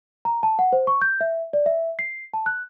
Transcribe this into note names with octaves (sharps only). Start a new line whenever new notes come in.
A#5
A5
F#5
C5
C#6
G6
E5
D5
E5
C7
A5
F#6